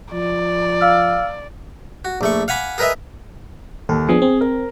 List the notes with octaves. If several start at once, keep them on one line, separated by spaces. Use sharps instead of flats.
F3 D5
F5 E6 F6
F#4
A#1 A3 C#6
F5 F#5 G#5 B5 D6
G#4 A#4 B4 D#5 E5
D#2 A4
F3 B3 D4 G#4
C4
A#4